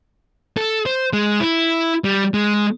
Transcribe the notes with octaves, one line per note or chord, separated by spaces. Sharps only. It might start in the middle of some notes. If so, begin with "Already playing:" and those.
A4
C5
G#3
E4
G3
G#3